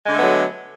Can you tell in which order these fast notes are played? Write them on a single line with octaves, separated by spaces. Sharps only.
G#3 D3 A3 B3 F#3